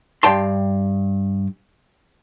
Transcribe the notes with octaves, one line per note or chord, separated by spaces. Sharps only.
G2 G5 A5 C6